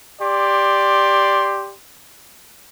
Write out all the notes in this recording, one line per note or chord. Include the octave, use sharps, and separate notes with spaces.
G4 D5 C6